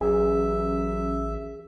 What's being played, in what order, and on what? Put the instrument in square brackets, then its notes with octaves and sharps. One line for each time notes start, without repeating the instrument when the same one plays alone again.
[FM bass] A1 [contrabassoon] F#2 [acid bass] G#4 [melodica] E5